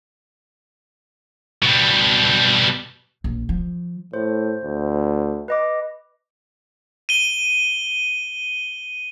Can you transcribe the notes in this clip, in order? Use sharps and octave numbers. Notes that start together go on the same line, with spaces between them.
B2 G3
A#1
F3
A2 C5
D2
B4 D#5 D6
D#7 G7